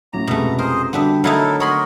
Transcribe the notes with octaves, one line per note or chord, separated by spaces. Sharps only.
A2 F#3 C#4 A#5 D6
F1 B2 G#3 A3
G#4 A#4 C5 D#5
D3 G3 B3 D4 F#4 G4 E5 A5
F#3 A3 B3 D#4 E4 A4 A#4
F#4 A#4 C#5 D#5 B5 C6